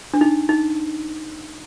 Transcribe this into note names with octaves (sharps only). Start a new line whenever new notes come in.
D4
D#4
D#4